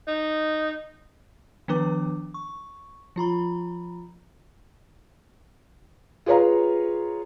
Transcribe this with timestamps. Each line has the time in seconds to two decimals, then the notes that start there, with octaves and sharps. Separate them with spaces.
0.07 D#4
1.68 D#3 F3 B3 D4 B4 D6
2.34 C#6
3.16 F3 F4 A#5 B5
6.26 F4 G#4 B4 C#5 F5 A#5